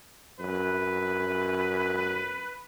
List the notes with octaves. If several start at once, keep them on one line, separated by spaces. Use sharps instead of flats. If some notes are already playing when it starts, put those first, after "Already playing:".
F#2 B4